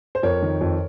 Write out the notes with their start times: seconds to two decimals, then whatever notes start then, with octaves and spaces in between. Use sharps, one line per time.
0.15 C5
0.23 F2 A#4 C#5
0.42 D#3
0.61 F2